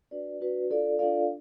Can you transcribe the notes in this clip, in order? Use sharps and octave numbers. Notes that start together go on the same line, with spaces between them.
D4 F#4 B4 D5
D4 F#4 B4 D5
D4 F4 A4 D5 F5
D4 F4 A4 D5 F5